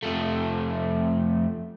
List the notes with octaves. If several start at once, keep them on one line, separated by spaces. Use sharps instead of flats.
F2 A3